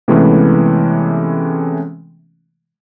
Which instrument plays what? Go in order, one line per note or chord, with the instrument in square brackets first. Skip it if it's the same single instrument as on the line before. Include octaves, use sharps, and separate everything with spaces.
[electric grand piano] C3 E3 G#3 A3 B3 C#4